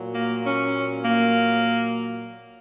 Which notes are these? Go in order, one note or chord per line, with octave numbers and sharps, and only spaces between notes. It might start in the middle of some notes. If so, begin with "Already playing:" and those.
Already playing: A#2 F#3
A#3
C#4
A#3